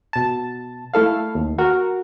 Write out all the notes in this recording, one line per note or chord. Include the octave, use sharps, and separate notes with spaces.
B2 A5
A3 E4 A4 F5
D#2
F#4 A#4